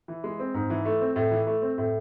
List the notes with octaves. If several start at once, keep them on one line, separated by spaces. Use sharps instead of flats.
E3
G#3
C4
G#2
E3
A3
C4
A2
E3
A3
C4
A2